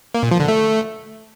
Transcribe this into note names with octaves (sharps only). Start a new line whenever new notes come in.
A#3
A#2
F3
D3
A3